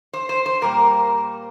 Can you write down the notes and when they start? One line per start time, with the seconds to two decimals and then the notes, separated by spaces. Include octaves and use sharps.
0.13 C5
0.29 C5
0.46 C5
0.61 A#2 G3 A#3 A#4